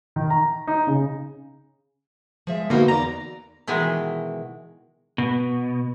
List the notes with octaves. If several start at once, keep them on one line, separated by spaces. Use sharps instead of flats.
D#3
A#5
D#4
C#3
F3 G#3 E5
B2 D3 A#3 D#4 F#4
E2 D5 A#5
B2 D#3 E3 G#3
B2